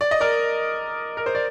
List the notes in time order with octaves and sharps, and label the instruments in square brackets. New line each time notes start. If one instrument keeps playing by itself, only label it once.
[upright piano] D5
D#5
A#4 D5
A#4
C5
D5